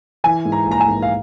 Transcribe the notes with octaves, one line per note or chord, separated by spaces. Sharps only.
E3 G#5
G#2
A#5
A#1 A#5
G#5
G#2
F5